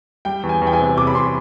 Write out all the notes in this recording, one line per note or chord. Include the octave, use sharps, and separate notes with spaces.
G3 G5
E2
G#5
E2
G5
G#5
C3
C3 D6
B5
C3 C6